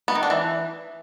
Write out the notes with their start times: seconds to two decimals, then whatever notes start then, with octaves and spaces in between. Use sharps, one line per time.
0.08 B3
0.15 D#3
0.23 D4
0.30 E3